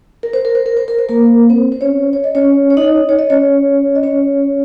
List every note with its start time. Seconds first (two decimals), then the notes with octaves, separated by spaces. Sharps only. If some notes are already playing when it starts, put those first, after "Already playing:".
0.23 A#4
0.33 C5
0.45 A#4
0.55 C5
0.66 A#4
0.77 C5
0.88 A#4
0.98 C5
1.09 A#3 A#4
1.50 C4 C5
1.72 C5
1.81 C#4 C#5
2.13 C#5
2.24 D#5
2.35 C#4 C#5
2.70 C#5
2.77 D#4 D#5
3.09 C#5
3.19 D#5
3.30 C#4 C#5
3.95 D#5
4.03 C#4 C#5